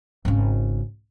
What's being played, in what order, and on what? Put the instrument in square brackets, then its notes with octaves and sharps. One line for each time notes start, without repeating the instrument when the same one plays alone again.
[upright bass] G#1 C#3